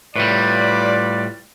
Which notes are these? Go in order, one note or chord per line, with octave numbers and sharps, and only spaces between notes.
A2 G3 F4 B4 D5